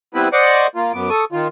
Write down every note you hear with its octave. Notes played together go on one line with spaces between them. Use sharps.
G3 B3 C4 E4 B4
C5 D5 D#5 F#5 C#6 D6
A#3 F4
F#2 B3 D6
A4 C#6 D#6
D#3 F4